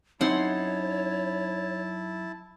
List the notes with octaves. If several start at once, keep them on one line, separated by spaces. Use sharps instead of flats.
F#2 C4 D#4 E4 C#5 F#5 A5 C6